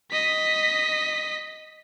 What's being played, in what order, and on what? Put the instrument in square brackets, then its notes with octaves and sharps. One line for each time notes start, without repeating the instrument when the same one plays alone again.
[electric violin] D#5 B6